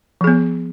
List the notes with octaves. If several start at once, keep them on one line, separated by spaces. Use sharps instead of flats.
F3 B3 G#4